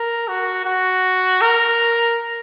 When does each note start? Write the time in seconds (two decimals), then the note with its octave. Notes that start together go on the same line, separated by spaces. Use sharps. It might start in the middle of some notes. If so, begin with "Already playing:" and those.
Already playing: A#4
0.28 F#4
0.65 F#4
1.41 A#4